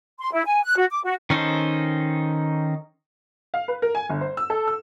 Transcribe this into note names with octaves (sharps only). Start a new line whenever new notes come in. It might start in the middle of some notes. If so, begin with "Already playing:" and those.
C6
E4
G#5
F#6
F#4
D6
F#4
D#3 C#4 D#4 A4 C5
F5
B4
A#4
G#5
G1
C5
E6
A4
E6